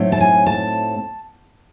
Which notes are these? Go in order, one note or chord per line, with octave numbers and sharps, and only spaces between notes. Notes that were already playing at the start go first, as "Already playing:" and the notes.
Already playing: A2 F#3 A3 C4 D#4
A5
G#5
A5